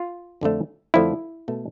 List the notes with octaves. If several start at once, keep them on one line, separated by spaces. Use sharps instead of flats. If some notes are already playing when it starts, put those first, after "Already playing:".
Already playing: F4
F2 D3 F3 A3 D4
F2 D3 F3 A3 D4 E4
B2 A3